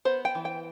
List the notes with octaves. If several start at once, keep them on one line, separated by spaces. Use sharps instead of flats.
B3 C5
G5
E3
G5